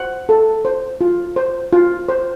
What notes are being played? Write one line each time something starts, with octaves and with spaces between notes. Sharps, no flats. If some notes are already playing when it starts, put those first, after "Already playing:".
Already playing: C5 F#5
A4
C5
F4
C5
F4
C5